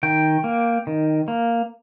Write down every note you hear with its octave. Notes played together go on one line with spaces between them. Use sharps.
D#3 G5
A#3
D#3
A#3